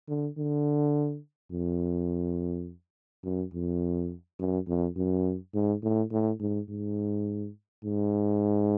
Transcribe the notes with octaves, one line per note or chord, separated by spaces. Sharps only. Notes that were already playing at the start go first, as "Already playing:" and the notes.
D3
D3
F2
F#2
F2
F#2
F2
F#2
G#2
A2
A2
G#2
G#2
G#2